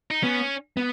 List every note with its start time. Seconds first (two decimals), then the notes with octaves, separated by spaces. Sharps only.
0.11 D#4
0.23 B3 C#4
0.77 B3